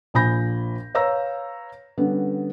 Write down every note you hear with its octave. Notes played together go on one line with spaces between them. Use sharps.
A#1 A#2 G#5 B5 G6 A#6
B4 C#5 F5 A#5 E6 A#6
D3 G3 B3 C#4